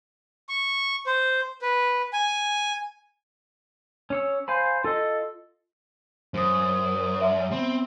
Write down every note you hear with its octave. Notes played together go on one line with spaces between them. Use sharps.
C#6
C5
B4
G#5
C#4 C#5 E6
C5 F5 G#5 B5
F4 A4 D#5
F#2 C5 D#6
E5 F#5 C6
B3 C4